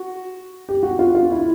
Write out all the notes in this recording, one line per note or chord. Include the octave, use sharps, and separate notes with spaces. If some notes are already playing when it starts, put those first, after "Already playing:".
Already playing: F#4
G4
F#4
F4
F4
E4